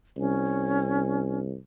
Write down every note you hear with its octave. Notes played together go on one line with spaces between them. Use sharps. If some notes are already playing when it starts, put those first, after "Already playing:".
C2 C#4